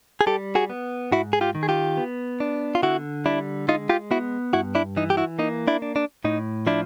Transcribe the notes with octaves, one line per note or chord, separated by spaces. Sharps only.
G#4
G3 G4 A4
F#4 G#4
B3
G#2 E4 F#4
G#4
F4 G4
D#3
G#4
F4 G4
B3
D4
F4
D3 E4 F#4
G3 D4 E4
G#3 D#4 F4
F4 G4
B3 E4 F#4
G2 E4 F#4
D4 E4
E3 D#4
G4
E4 F#4
A#3 D#4
D4 E4
D4
D4
A2 D#4
F3 D4 E4